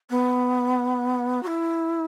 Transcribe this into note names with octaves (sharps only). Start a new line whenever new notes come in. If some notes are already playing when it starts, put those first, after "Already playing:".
B3
F#4
E4